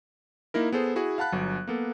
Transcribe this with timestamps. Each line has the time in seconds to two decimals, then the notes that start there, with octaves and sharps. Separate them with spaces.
0.54 A#3 D#4 E4 A#4
0.72 B3 G#4 A4 C5
0.96 E4 F#4 G#4
1.18 F5 F#5 A5 B5 F#6
1.32 G1 F#3
1.68 A#3 B3 A4